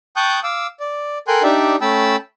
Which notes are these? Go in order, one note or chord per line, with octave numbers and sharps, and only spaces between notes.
G5 A5 C#6 D#6 F#6 G6
F5 D6 E6
D5
A4 A#4 G5 G#5 C6 F#6
D4 D#4 G4 D5 E5
A3 C#4 G5 A5 B5 E6